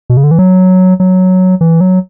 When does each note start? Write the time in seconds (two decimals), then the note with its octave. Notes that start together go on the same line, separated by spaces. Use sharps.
0.10 B2
0.17 C#3
0.24 D3
0.31 E3
0.39 F#3
1.00 F#3
1.61 E3
1.81 F#3